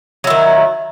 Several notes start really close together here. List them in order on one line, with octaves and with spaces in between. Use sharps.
F#3 E4 D#3